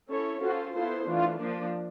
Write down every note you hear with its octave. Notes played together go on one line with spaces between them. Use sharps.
C#4 E4 A4 C#5
C#4 F4 F#4 A4 C5
B3 E4 F4 A4 C5
E3 A3 D4 F4
F3 A#3 D4